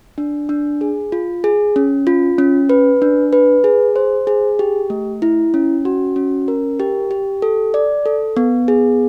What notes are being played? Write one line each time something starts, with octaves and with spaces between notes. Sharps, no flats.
D4
D4
G#4
F4
G#4
C#4
F4
C#4
B4
D4
B4
G#4
C5
G#4
G4
A3
E4
C#4
F#4
C#4
A#4
G4
G4
A4
D5
A4
B3
G#4